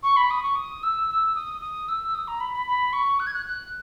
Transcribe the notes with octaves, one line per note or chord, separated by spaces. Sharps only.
C#6
B5
D#6
C#6
D#6
E6
E6
D#6
D#6
E6
D#6
A#5
B5
B5
B5
C#6
F#6
G#6
F#6
F#6